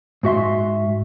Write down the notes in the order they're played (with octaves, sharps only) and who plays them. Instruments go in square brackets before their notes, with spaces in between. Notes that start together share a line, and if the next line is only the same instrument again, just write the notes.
[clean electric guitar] G#2 F#4 E5 C6